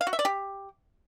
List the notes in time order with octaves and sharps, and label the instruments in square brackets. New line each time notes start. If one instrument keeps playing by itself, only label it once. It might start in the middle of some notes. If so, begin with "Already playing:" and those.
[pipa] F5
F#4
E5
D5
G4